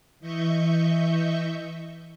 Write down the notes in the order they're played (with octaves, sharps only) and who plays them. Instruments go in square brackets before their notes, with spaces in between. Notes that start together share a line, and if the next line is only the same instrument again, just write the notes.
[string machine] E3 D#5 E5 C#6 G6